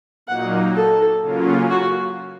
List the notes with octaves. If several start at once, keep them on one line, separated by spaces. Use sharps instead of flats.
A#2 F#3 A#3 D#4 F#5
A4
C#3 F#3 A#3 C#4 F4
F#4